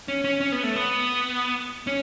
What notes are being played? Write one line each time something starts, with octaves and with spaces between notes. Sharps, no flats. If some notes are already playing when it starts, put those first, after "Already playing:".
C#4
C#4
C#4
B3
A3
B3
C#4